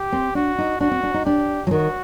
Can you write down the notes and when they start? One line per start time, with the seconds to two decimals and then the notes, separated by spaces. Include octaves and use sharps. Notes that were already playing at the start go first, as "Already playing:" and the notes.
Already playing: G4
0.12 C4
0.35 D4 F#4
0.58 D#4
0.80 D4 F#4
0.91 C4
1.03 D4
1.14 D#4
1.25 D4 G4
1.67 F#3
1.71 D#3 F#4